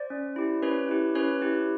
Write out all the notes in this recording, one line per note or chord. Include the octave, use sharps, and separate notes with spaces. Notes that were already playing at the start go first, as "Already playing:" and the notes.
Already playing: C5 D5
C#4
E4 G4
C#4 B4 C#5
E4 G4
C#4 B4 C#5
E4 G4